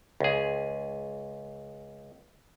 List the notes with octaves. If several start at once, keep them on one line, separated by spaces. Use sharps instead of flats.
C#2 G#4